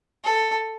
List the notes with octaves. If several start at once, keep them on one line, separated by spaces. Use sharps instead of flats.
A4